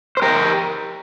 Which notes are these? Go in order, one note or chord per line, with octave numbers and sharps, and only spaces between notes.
C5
G4 A#4